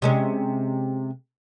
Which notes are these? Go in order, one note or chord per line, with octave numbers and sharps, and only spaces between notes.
C3 G#3 C#4